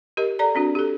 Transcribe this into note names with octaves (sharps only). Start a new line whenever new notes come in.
G4 A#4 D#5
A4 D5 A#5
C4 D4 F#4
G4 A4